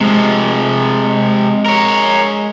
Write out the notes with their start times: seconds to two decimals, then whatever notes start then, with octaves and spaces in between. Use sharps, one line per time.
0.01 C3 F3 G#3
1.66 A#4 C#5